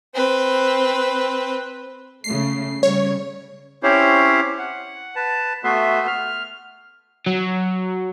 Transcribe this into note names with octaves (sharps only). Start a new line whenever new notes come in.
C4 B4
C#3 A3 C7
C#3 G3 C#5
C4 C#4 E4 G4 C5 C#5
F#5
B4 A5
A3 B3 F#4 B4 E5 C6
F6
F#3